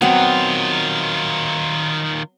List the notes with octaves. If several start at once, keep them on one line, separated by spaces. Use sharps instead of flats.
D#3 F#3 B3 C4 F4